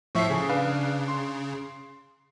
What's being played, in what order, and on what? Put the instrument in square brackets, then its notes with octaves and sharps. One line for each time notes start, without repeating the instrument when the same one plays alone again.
[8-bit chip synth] A2 F3 E5 [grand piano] C#6 C7
[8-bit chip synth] C#3 [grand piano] G#4
[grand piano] D4 B4 F5
C6